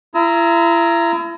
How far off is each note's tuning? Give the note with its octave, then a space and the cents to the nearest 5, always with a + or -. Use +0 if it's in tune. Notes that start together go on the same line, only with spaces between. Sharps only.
E4 +40 A#5 +0 E6 -45